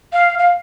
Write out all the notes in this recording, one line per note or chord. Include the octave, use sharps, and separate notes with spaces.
F5
F5